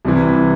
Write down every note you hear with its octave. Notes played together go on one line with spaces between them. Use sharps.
C2 C3 E3